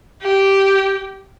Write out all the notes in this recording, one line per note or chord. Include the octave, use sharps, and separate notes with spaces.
G4